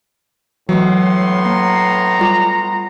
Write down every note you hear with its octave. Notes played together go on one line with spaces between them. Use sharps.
A2 E3 F#3 G#3 B3 C6
A#3 A#5
G3 F4 D6